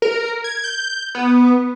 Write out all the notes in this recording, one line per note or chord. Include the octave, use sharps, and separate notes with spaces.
A#4
G#6
G6
B3